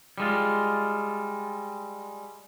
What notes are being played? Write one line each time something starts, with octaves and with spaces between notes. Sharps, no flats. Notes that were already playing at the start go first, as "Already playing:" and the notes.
G3 G#3 F4